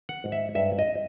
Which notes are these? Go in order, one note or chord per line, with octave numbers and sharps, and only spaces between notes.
F#5
G#2
E5
G2 E5
D#5